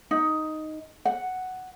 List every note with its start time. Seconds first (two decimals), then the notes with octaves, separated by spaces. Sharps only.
0.11 D#4
1.05 F#5